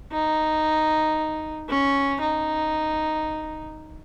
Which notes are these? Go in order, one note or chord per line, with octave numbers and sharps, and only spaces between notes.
D#4
C#4
D#4